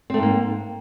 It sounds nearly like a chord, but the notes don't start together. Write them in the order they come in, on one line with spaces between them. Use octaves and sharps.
C4 A3 G#2 A#3